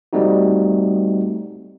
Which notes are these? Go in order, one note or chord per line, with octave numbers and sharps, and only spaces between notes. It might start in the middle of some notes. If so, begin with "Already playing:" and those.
G3 A3 C4 D#4 F#4